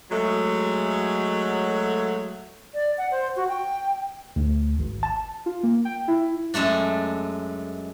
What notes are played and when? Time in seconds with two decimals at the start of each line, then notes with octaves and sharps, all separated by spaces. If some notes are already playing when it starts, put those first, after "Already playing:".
0.11 F#3 G#3 A3
2.74 D5
2.98 F#5
3.11 C5
3.36 F#4
3.48 G5
4.36 D2
4.79 G#1
5.03 A5
5.46 F4
5.63 A#3
5.85 G5
6.08 E4
6.54 F#2 G#3 A3 D4